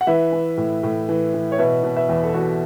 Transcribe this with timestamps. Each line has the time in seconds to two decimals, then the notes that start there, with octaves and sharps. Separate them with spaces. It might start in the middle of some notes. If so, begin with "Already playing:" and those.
0.01 F#5
0.07 E3 B4 E5
0.33 E3
0.57 A2
0.83 A2
1.09 E3
1.34 E3
1.52 C#5
1.59 B2 B4 E5
1.83 B2
1.96 B4 E5
2.09 E2
2.23 A4
2.34 E2 F#4